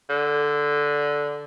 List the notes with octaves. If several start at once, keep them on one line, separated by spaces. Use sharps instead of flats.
D3